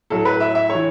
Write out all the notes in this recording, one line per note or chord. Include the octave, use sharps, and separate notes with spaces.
A2 F#3 A4
B4
E5
E5
E3 C#5